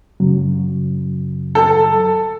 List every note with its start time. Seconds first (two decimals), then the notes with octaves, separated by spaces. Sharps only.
0.20 F#2 C#3 F#3
1.55 A4